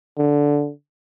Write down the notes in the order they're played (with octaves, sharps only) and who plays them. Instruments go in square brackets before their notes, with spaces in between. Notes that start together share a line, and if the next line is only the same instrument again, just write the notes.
[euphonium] D3